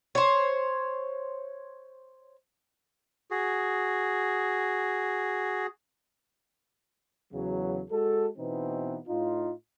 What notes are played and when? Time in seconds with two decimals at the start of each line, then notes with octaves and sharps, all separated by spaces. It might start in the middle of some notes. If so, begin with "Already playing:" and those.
0.15 C5 C#5
3.31 F#4 G#4
7.33 E2 C#3 F#3
7.91 G#3 F#4 A4
8.38 B2 E3 B3 C4 D#4
9.08 A2 D#4 F4